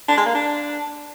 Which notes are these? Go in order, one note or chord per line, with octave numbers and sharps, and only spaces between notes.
D4
G#3
A#3
D4